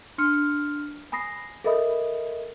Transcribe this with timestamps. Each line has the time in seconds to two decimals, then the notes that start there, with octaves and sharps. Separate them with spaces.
0.18 D4 C6 F6 C#7
1.12 G#5 B5 D#6 A#6 C7
1.64 A4 A#4 D#5 E5 B5 D#6